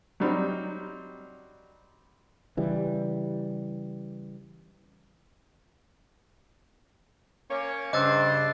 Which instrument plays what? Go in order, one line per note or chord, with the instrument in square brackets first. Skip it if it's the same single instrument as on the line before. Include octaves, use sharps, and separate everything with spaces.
[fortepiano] F#3 G3 C4 D#4
[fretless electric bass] C#3 E3 G3
[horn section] A#3 C#4 C#5 [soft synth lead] D6
[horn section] G2 C5 [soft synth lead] C#3 [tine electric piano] D#5 E6 [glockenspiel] D6 F#6 A6